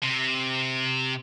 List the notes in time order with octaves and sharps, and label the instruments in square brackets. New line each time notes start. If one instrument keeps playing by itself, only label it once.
[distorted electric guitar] C3